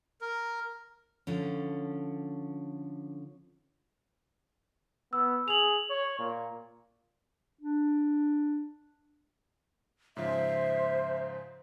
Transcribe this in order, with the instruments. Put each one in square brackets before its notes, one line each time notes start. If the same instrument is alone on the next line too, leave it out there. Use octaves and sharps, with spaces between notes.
[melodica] A#4
[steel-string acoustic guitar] D3 F3 C#4
[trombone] B3 [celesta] E6
[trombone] G#4 [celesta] F7 F#7
[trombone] C#5
A#2
[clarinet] D4
[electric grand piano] G#2 C#3 F3 [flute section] C5 [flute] E5